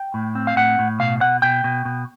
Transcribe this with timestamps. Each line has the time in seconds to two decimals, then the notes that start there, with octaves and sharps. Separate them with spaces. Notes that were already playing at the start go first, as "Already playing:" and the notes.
Already playing: G5
0.14 A2
0.35 C4
0.47 F5
0.56 A2 F#5
0.79 A2
1.00 B2 F5
1.21 B2 F#5
1.42 B2 G5
1.64 B2
1.85 B2